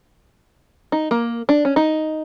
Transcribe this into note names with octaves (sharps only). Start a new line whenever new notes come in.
D#4
A#3
D4
C#4
D#4